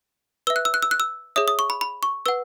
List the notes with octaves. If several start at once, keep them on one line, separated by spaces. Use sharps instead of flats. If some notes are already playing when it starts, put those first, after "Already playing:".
B4 E5 E6
F#6
E6
F#6
E6
F#6
E6
G#4 C#5 E5 D#6
D#6
C#6
B5
B5
C#6
B4 F#5 E6